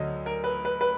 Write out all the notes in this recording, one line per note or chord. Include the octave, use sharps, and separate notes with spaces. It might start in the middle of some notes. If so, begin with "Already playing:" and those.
Already playing: D2 D3 F#3 D#5
A#4
B4
B4
B4